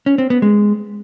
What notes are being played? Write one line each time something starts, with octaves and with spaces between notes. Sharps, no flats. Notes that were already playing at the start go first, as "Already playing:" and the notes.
C#4
C4
B3
G#3